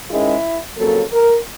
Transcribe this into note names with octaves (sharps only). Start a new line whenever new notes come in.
G#2 D#3 G#3 C#4 E4
F2 C#3 F#3 A#3 A4
A#4